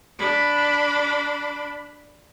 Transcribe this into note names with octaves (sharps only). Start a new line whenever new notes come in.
D4 B5